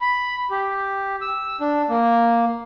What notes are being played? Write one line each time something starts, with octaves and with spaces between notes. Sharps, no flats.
B5
G4
E6
D4
A#3